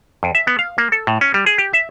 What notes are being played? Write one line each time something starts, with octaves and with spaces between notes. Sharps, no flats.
F2
E5
B3
F5
A#3
A4
A2
C#4
G3
G#4
G4
E5